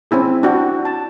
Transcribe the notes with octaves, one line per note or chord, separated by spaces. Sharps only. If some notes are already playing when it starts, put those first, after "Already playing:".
C4 C#4 E4 G#4
D4 E4 F#4 G5
A5